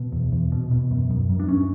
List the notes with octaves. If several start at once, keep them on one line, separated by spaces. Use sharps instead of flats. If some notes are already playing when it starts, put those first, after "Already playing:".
Already playing: B2 B3
E2
E2
B2
B2
F#2
F#2
F#2
D4
F#2 C#4